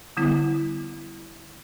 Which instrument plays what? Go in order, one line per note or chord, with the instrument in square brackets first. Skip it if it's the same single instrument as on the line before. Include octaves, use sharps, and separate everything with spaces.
[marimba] D3 G3 B3 E4